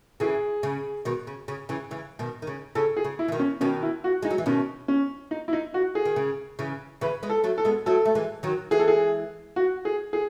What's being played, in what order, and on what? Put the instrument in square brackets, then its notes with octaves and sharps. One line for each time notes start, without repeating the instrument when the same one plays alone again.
[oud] C#3 E3 [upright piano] G#4
[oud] C#3
B2 D#3
C#3
C#3
C#3 E3
C#3 E3
B2 D#3
D#3
C#3
[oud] C#3 [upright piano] A4
[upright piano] G#4
[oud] C#3
[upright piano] E4
[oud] E3
B2 D#3
[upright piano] C#4
[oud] B2 D#3 [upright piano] C#4
[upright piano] E4
F#4
[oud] G#3 [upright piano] D#4
[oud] F#3
E3
[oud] B2 D#3 [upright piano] C#4
[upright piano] C#4
D#4
E4
D#4
F#4
G#4
[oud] D#3
C#3
C#3 E3
[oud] C#3 E3 [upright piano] B4
[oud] G#3 B3
[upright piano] A4
[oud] F#3 A3
[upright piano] A4
[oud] G#3 B3
[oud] F#3 A3 [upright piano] A4
[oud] A3
E3 G#3
D#3 F#3
[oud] E3 G#3 [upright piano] G#4
[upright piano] A4
G#4
F#4
G#4
G#4